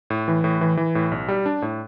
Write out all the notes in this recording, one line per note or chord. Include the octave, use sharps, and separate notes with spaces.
A2
E3
A2
E3
E3
A2
B1
G3
D4
A2